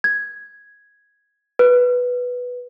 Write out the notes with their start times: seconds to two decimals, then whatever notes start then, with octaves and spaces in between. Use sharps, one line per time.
0.04 G#6
1.59 B4